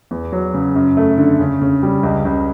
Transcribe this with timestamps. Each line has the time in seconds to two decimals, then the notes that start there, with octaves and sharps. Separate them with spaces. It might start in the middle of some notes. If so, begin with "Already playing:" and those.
0.11 E2
0.32 F#3
0.54 C#3
0.75 F#2
0.97 A3
1.18 D3
1.39 C#3
1.62 C#3
1.83 G3
2.03 C#2
2.25 C#2